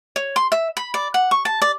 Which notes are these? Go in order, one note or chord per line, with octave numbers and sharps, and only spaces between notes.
C#5
C6
E5
B5
D5
F#5
C#6
A5
D5